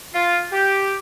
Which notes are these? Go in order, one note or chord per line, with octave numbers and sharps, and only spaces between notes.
F4
G4